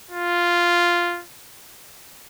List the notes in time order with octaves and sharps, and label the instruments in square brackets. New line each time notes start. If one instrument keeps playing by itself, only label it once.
[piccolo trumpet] F4